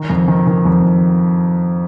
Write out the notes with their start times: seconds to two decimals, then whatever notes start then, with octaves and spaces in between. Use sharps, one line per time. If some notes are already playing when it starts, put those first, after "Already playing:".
Already playing: D#3
0.10 F2
0.28 D#3
0.47 D#3
0.65 F2